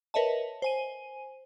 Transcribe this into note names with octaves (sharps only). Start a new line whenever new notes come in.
A#4 B4 C#5 D#5 E5 A5
C5 G#5 D#7